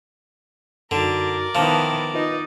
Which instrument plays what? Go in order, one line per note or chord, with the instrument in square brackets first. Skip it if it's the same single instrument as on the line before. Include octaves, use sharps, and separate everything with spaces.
[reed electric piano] F#2 D#4 F#4 [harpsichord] D3 [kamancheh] A#4 D5
[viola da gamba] D#3 B3 E4 [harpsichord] F3 [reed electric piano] F5 A5 D6
[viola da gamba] D#4 [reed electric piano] F4 B4 D#5